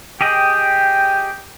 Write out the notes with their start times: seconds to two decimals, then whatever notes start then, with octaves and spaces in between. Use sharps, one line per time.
0.21 G4 G#4 D#5 G5